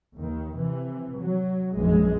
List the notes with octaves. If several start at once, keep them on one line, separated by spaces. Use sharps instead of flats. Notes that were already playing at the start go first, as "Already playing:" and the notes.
D#2 D#3
C3 E3
F#3
A#1 F#2 E3 G#3